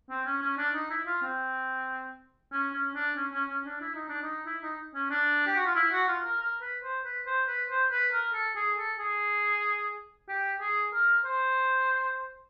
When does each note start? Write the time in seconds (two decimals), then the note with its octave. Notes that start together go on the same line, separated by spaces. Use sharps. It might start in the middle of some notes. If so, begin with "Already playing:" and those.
0.10 C4
0.26 C#4
0.42 C#4
0.57 D4
0.74 D#4
0.90 E4
1.06 F4
1.22 C4
2.52 C#4
2.74 C#4
2.95 D4
3.16 C#4
3.33 C#4
3.49 C#4
3.66 D4
3.81 E4
3.95 D#4
4.08 D4
4.22 D#4
4.46 E4
4.62 D#4
4.95 C#4
5.11 D4
5.47 G4
5.56 F#4
5.66 F4
5.75 E4
5.92 F#4
6.08 F4
6.24 A#4
6.40 A#4
6.61 B4
6.83 C5
7.05 B4
7.27 C5
7.48 B4
7.70 C5
7.91 B4
8.12 A#4
8.34 A4
8.56 G#4
8.77 A4
8.99 G#4
10.29 G4
10.60 G#4
10.93 A#4
11.25 C5